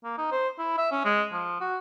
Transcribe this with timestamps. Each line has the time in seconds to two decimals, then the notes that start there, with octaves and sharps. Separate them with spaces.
0.04 A#3
0.18 D#4
0.32 C5
0.58 E4
0.78 E5
0.91 C#4
1.05 G#3
1.32 F3
1.61 F#4